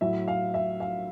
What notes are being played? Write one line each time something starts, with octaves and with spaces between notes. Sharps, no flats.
A2 F#3 E5
F5
E5
F5